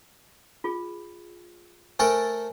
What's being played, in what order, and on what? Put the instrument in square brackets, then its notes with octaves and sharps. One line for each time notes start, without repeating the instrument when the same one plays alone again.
[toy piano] F4 G#4
[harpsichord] A3 A4 A#4 [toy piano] C5 G#5